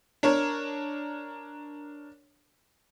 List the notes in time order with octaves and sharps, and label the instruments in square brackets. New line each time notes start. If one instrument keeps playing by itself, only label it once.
[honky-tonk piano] D4 A#4 C#5